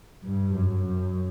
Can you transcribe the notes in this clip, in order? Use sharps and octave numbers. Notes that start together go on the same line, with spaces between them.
G2
F#2
F#2